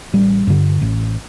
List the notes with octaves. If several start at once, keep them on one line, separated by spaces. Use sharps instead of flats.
A1 G3
G2 D3
A1